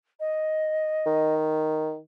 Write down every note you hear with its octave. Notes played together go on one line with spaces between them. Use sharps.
D#5
D#3